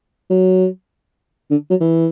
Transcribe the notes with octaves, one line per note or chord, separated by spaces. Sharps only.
F#3
D3
F#3
E3